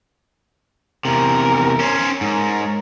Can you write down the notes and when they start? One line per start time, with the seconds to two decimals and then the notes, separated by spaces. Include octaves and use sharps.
1.05 E2 C3 A#4
1.80 C#4 C5
2.21 G#2 A#4 C#5